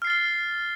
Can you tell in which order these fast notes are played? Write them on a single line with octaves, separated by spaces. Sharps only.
F6 C7 A6 G7